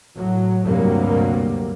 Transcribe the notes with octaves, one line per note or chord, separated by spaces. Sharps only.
A2 F#3
D2 G2 C3 F#3 G3 A#3